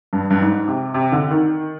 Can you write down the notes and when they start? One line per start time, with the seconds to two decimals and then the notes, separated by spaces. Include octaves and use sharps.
0.13 G2
0.30 G2
0.41 G#2
0.68 C3
0.94 C3
1.12 D3
1.31 D#3